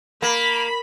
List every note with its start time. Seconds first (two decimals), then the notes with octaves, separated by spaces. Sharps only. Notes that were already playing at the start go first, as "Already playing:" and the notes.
0.22 A#3 B5